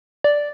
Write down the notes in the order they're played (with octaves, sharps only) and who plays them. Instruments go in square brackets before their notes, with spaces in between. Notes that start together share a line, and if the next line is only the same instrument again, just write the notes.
[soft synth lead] D5